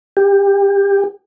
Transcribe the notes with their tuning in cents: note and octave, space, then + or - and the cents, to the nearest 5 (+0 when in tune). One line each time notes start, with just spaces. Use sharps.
G4 +25